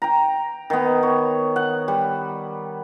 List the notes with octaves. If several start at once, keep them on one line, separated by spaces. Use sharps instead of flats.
G5 A#5
D#3 B3
C#5
F#5
G3